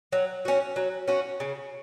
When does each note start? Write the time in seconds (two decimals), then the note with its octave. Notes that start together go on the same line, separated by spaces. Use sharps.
0.12 F#3
0.45 C#4 F#4
0.76 F#3
1.08 C#4 F#4
1.40 C#3